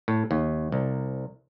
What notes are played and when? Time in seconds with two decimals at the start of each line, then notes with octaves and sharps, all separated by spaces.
0.08 A2
0.31 D#2
0.72 C2